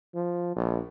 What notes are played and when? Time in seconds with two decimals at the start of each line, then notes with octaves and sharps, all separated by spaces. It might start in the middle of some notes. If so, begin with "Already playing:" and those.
0.15 F3
0.56 A#1